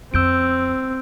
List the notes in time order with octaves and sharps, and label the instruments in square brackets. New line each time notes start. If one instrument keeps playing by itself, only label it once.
[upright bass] F2 [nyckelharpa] C4 [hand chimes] E6 G6 D7